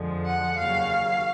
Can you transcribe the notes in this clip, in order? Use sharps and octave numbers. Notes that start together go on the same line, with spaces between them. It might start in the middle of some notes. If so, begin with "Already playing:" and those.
Already playing: F2 D3 F3 G#3
F#5
D#2 C#3 F#3 F5